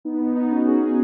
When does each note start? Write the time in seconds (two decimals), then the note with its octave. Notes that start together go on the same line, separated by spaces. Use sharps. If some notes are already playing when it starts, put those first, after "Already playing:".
0.05 B3 D#4
0.20 B3 D#4
0.35 B3 D#4
0.51 C#4 F#4
0.67 D#4 G#4